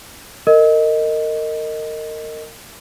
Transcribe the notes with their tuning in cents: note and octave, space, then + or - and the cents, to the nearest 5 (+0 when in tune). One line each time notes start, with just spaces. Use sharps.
A#4 -30 D#5 +0